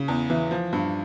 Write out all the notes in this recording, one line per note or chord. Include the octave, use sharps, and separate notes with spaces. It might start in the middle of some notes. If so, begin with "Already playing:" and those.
Already playing: C#3
E2
E3
F3
G2